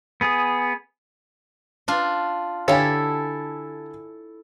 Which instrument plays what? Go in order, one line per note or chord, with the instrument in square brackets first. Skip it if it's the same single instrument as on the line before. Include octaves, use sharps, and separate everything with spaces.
[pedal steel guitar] B3 G#4
[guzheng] D4 F4
[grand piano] D3 G#5 [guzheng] E4 A4 [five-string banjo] G4 C#5 F5